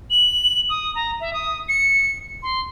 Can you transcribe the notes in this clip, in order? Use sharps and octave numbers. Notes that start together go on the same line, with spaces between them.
F#7
D#6
A#5
E5
D#6
C#7
C6